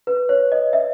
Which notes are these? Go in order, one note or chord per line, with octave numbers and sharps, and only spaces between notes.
B4
C#5
D#5
E5